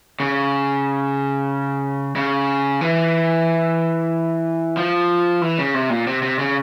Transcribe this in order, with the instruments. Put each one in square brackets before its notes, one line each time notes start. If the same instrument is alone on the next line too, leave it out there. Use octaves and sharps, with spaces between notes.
[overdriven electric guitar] C#3
C#3
E3
F3
E3
C#3
C3
A#2
C3
C3
C#3